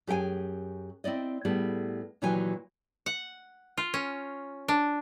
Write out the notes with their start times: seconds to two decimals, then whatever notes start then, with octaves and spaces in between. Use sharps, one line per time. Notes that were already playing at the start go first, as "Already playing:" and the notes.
0.07 F#2 G4 G#4 G5 G#5
1.04 C4 E4 D5 D#5
1.45 A2 G3 B3 G#4
2.22 A#2 D#3 E3 F#3 G4 G#5
3.06 F#5
3.77 F4
3.94 C#4
4.68 D4